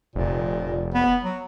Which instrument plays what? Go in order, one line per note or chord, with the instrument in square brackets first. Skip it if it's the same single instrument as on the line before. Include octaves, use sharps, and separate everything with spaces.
[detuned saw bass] F1 [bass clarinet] A#2
[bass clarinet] B3
F#3